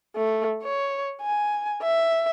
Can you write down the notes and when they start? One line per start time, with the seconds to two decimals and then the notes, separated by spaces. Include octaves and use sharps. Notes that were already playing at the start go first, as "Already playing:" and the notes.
0.16 A3
0.63 C#5
1.21 G#5
1.82 E5